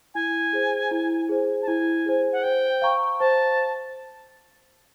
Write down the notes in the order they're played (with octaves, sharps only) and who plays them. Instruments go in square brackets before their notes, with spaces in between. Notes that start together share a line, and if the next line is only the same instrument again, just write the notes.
[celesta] E4 [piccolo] G#5
[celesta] G#4 C5
E4
G#4 C5
[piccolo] A5
[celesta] E4 [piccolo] G#5
[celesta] G#4 C5
[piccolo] F#5
[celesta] C5 [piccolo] G5
[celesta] F5 A#5 C#6
[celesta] C5 [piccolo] A5